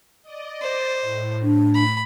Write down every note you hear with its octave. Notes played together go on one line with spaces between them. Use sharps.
D5 D#5
C5
A2
D4
B5